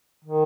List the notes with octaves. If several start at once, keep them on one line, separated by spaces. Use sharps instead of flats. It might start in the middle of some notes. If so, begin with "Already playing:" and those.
D#3